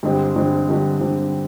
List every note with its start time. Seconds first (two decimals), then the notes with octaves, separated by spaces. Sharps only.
0.03 G2 D3 G#3 C4 G4
0.36 G2 D3 G#3 C4 G4
0.68 G2 D3 G#3 C4 G4
1.01 G2 D3 G#3 C4 G4